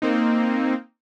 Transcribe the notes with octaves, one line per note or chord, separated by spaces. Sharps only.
A#3 C4 D#4